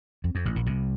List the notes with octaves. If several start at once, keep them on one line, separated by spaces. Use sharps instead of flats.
F2
F2
A1 A2
A#1 A#2
C2 C3